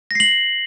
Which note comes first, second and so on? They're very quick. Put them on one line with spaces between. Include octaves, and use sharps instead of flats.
A#6 C7 F#7